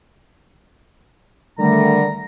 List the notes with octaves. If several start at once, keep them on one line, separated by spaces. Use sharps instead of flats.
D3 D#3 G3 A3 A#5